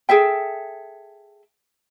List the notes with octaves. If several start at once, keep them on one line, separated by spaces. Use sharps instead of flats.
G#4 A4 E5 G5